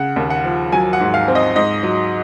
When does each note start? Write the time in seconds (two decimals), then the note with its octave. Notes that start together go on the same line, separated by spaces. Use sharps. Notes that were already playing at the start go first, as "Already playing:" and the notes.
Already playing: C#3 F#5
0.16 D#2
0.30 F#5
0.44 F3
0.72 F#3 G#5
0.93 F#5
1.00 G#2
1.14 F5
1.28 C4
1.35 D#5
1.56 G#2 D#5
1.83 F#3